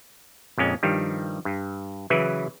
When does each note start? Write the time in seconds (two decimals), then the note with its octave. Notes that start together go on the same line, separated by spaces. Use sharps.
0.58 A#1 F2 G#3 C#4
0.83 G2 D#3 F3 G3
1.45 G2
2.10 C#3 E3 F#3 E4 B4